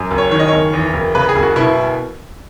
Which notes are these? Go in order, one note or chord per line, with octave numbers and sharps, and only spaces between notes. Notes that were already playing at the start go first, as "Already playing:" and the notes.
Already playing: F#2
F#1
C#5
D#3 C#5
D#5
F#1 C#5
E2
F#1
C#3 B4
G#4
F#1
F#4
B2 E4